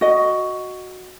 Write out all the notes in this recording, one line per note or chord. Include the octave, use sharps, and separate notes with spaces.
F#4 D#5